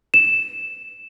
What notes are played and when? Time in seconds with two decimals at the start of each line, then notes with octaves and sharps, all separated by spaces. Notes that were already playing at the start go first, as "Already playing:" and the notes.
0.14 E7